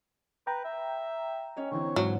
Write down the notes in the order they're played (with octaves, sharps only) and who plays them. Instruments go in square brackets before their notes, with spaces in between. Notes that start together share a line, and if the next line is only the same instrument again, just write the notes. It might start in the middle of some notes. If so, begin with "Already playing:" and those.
[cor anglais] B4 [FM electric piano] G5 A#5
[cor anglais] E5
[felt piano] C#4 C#5 D#5
[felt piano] D3 E3 C4 [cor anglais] C#5
[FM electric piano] G#2 [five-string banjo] F#3